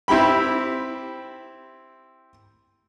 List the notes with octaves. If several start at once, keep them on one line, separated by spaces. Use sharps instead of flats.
C4 E4 G4 G5 B5